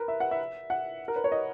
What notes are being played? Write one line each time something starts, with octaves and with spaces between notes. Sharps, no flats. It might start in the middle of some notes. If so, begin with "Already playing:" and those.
Already playing: A#4 B4
E5
F#5
E5
F#5
A#4
B4
C#5
D#5